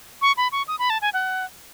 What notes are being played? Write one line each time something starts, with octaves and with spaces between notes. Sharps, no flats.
C#6
B5
C#6
D#6
B5
A5
G#5
F#5